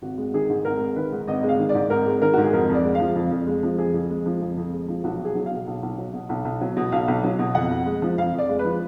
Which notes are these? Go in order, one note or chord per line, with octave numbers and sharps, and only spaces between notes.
G#1 F#4
G#3
D#3 G#4
G#2
G#1 A#4
G#3
D#3 B4
G#2
G#1 D#5
G#3
F5
D#3
D5
G#2
G#1 A#4
G#3
D#3 A#4
G#2 F#4
G#4
F2 A#4
F2 D5
G#3
F5
F3
F2
F2
G#3
F3
F2 G#4
F2
G#3
F3
F2
F2
G#3
F3
B1 F#4
B1
G#4
F#3
F5
B2
B1
B1
F#3
B2
B1
B1
F#3
B2
B1 F5
B1
F#3
B2
F2 F#5
F2
G#3
F3
F2 F5
F2
D5
G#3
B4
F3